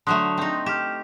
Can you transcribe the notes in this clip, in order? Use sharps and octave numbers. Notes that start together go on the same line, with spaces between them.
D3 F#3 A3 C6 D#6 F#6
C4 D#4
G4 F6 E7